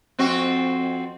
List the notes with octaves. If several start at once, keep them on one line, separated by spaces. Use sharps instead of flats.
F2 C4 F#4